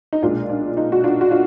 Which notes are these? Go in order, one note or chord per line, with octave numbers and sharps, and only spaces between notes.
D#4
B1 A#2 G#3 D4 F4
D4
D#4
F#4
D4 F4
F#4
D4 F4